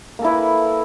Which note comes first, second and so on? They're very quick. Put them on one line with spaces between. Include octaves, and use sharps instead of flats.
A#3 A4 E4 B4